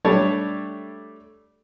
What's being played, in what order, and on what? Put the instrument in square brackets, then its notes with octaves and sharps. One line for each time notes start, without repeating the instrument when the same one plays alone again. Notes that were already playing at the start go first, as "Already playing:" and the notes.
[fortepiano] G3 A3 D4 C#5 A5